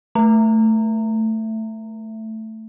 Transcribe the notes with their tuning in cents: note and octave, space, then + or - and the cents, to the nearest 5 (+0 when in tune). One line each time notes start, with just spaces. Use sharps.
A3 +5 E5 +15